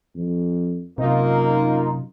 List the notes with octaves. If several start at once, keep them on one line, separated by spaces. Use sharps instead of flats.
F2
F#2 C3 A#3 D#4 F4